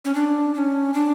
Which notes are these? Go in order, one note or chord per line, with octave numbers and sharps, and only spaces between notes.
C#4
D4
D4
C#4
D4